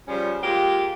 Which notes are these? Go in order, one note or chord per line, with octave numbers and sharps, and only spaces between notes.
C#3 F3 G3 C#4
G#3 A#3 F4 G4